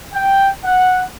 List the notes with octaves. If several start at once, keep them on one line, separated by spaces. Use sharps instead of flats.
G5
F#5